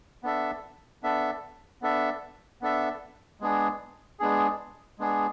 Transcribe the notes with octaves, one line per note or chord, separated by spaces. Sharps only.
B3 D4 A4 E5
B3 D4 A4 E5
B3 D4 A4 E5
B3 D4 A4 E5
G#3 B3 D4 G#4
G#3 B3 D4 G#4
G#3 B3 D4 G#4